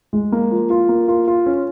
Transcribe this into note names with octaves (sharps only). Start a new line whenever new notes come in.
G#3
A#3
F3
F4
A#3
F4
F4
C#4